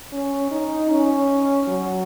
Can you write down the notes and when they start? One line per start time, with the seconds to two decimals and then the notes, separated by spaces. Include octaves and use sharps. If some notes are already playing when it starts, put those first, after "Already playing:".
0.13 C#4
0.51 D#4
0.90 C#4
1.68 F#3